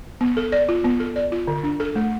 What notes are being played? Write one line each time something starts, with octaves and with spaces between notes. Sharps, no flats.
B3
A4
D5
F4
B3
A4
D5
F4
D3
D4
A4
A3